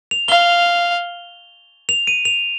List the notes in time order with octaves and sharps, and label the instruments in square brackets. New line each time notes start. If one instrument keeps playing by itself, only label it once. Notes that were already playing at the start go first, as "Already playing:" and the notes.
[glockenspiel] F7
[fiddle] F5 [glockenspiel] G7
[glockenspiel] F7
D#7
F7